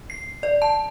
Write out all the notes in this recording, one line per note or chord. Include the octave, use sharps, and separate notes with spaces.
C7
D5
A5